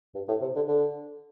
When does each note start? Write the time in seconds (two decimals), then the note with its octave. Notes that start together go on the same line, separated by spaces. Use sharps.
0.15 G2
0.28 A2
0.41 C3
0.56 D3
0.68 D3